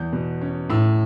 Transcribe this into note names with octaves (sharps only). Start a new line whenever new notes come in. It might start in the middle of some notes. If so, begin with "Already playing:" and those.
Already playing: E2 G6
B2
C#4
A2 E6